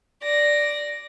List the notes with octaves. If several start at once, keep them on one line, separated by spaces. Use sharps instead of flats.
D5 A#6